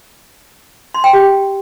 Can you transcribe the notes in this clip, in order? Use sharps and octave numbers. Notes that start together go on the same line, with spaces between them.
C6
G5
G4